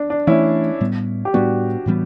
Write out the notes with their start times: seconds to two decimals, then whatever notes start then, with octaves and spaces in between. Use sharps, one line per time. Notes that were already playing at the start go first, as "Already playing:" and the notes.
Already playing: D4
0.10 D4
0.27 E3 A3 C#4 D4 E4
0.81 A2 G3 B3
1.25 G4
1.33 A2 G3 B3 D4 F#4
1.86 A2 E3 G3 B3